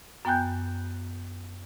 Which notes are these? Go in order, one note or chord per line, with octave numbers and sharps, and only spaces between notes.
F#2 B3 G5 G#5 F#6 G6